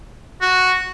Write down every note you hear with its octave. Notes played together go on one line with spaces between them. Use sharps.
F#4